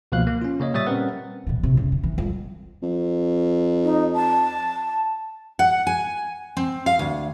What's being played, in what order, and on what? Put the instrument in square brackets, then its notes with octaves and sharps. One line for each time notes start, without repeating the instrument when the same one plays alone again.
[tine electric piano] C#2 B2 F3 A#3 F5 F#6
A#3
C#4 F4
C#3 A#3 C#5 D#5
A#2 G3 C#5 E5 D#6 A6
G3 C4 C#4 A#4 B4 F#5
[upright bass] A#2 E3
C3
E2 C#3
D3
E3
F2 G3
[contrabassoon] F2
[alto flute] D#4
A5
[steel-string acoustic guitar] F#5
G#5
C4
F5
D2